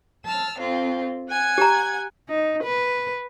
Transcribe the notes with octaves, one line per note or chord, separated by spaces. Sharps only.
A5 E6 F6
F2 C4 F4
F#5 G#5 G#6
G4 A#5
D#4
B4